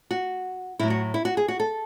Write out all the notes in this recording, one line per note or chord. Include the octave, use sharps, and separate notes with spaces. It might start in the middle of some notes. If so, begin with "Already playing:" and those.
F#4
A2 F#3 E4
F#4
E4
F#4
G#4
F#4
A4